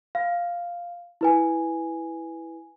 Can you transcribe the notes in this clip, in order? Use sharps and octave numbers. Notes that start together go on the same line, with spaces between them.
F5
E4 B4 G#5